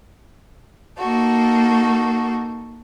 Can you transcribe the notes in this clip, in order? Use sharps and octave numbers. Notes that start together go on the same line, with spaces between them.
A#3 D#4 F#4 A4